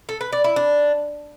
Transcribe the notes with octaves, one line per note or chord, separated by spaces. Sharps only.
A4
B4
D5
E4
D4